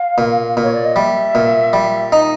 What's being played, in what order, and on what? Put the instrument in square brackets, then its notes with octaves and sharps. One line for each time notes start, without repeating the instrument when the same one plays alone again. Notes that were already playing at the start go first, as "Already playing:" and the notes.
Already playing: [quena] F5
[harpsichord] A#2
A#2
[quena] C#5
D5
D#5
[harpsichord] G3 [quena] E5
[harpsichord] A#2
G3
D#4